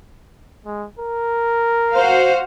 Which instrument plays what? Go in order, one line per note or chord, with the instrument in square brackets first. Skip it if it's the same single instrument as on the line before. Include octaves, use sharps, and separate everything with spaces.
[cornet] G#3
A#4
[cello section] F#4 C5 F5